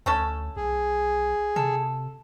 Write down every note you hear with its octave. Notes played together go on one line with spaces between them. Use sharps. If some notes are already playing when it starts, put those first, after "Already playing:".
D2 A3 C#4 A4
B1 G#4
C3 A4